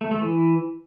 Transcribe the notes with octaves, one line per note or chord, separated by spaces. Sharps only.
A3
A3
E3